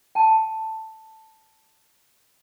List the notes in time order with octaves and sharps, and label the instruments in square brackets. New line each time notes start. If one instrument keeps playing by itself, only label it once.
[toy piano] G5 A5